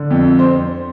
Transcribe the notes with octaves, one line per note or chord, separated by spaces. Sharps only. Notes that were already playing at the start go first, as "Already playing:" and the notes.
Already playing: D3
F2
C5